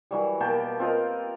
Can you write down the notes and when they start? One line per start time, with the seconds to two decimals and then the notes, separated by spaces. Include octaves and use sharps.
0.11 E3 F#3 G3
0.40 B2 A#3 G5 A5
0.79 C4 F4 A#4 D#5